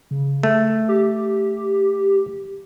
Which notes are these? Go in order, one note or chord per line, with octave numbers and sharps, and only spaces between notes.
C#3
A3
G4